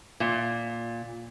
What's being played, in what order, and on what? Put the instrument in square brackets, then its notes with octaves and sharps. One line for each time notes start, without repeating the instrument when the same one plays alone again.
[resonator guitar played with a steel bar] A#2